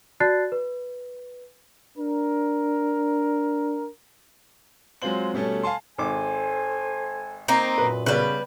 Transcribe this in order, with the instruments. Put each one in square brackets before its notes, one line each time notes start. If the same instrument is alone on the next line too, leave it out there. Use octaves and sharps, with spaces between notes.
[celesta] F#4 D5 A5 F#6 A6 C7
B4
[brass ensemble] D4 A#4
[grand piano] F#3 G#3 C4 F4 C5 F#7
B2 G3 A3 C#4 A4
F5 G#5 A5 C6
[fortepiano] G#1 D6 [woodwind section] A4 C5 G#5
[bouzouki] A#3 C4 D#4
[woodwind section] F#2 A#2 [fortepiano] B4
[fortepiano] C#3 B3 [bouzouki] G3 B4